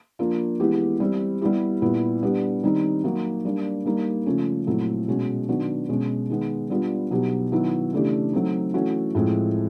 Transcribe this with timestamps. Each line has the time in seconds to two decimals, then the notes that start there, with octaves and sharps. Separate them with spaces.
0.19 F3 A#3 D4 F4
0.60 E3 G#3 B3 E4 G4
1.00 G3 C4 E4
1.41 G3 B3 E4 G4
1.82 A#2 G3 B3 E4 G4
2.23 G3 B3 D4 G4
2.63 D#3 G3 C4 D#4
3.04 F#3 A#3 D#4 F#4
3.45 G3 A#3 D4
3.85 G3 A#3 D#4
4.26 C#3 F3 A3 C#4
4.67 A#2 F#3 A3 C4 E4
5.08 B2 G#3 C#4 F#4
5.48 D#3 F#3 B3 D4 F#4
5.89 B2 G#3 C#4
6.30 D#3 G#3 B3
6.70 G3 B3 D4 F4
7.11 B2 F#3 B3 D#4 G4
7.52 D#3 F#3 B3 E4
7.92 C#3 E3 A3 D4 G4
8.33 F#3 A3 C4 D#4
8.74 E3 A3 C#4 F#4
9.15 A2 F3 G#3 C4